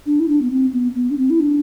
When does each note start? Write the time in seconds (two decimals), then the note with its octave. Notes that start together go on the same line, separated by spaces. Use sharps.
0.06 D4
0.20 E4
0.28 D4
0.42 B3
0.51 C4
0.73 B3
0.95 B3
1.10 D4
1.18 C4
1.30 E4
1.40 D4